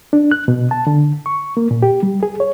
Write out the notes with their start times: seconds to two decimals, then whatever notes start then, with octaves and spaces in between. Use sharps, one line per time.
0.13 D4
0.31 F#6
0.48 B2
0.71 A5
0.87 D3
1.26 C#6
1.57 A#3
1.71 A#2
1.83 G4
2.03 G3
2.23 G#4
2.40 C#5